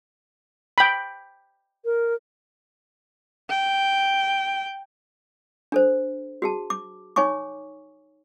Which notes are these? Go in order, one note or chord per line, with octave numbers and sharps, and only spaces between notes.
G5 B5
A#4
G5
D4 A4 C5
F#4 G#4 A5
D6
D#4 C#5 G#5 C#6 D6